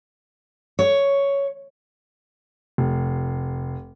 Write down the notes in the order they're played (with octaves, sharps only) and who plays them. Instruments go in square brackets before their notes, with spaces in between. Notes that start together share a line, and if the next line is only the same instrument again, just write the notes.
[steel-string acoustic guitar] C#5
[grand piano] F1